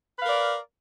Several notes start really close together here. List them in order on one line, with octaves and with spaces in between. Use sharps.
B4 F5 A#4 D5